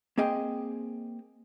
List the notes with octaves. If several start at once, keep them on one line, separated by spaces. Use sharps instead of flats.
A#3 C4 G#4 D#5 G5